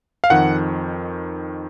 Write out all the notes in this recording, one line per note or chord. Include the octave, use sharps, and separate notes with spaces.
F5
F2 D#3 F#5